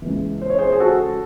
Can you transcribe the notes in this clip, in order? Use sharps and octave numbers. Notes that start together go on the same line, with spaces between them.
C#2 C#3 E3
C5
C#5
G#4 C5
G#4
F#4 A4